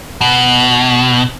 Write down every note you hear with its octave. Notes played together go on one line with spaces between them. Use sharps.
B2